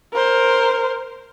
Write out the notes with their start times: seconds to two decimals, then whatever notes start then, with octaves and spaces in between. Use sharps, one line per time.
0.14 A#4 C5